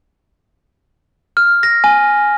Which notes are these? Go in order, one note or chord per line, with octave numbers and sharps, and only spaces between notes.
F6
A#6
G#5